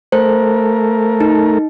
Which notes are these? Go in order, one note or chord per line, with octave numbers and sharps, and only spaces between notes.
A3 A#4 C5
D#4